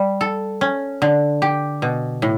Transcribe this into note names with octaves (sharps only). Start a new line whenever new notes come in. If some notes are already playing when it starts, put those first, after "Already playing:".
Already playing: G3
A4
C#4
D3
G4
B2
A2